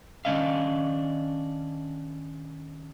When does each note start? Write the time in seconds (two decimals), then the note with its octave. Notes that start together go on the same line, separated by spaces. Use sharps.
0.25 D#3 G#3 C#4 D4 D#5 F5